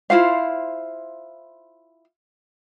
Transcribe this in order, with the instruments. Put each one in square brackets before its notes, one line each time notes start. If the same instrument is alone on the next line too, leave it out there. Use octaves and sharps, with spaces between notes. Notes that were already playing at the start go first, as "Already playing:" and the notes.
[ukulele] E4 F4 C5 F5